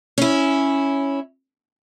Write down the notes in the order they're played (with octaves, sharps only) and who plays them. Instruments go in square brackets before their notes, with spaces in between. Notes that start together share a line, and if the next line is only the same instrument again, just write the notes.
[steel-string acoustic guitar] C#4 E4